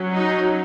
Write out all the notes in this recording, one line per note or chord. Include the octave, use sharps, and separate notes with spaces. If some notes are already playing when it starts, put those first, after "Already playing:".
Already playing: F#3 C#4
D#4